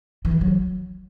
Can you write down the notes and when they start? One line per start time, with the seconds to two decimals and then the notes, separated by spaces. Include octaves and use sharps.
0.25 E3
0.41 F#3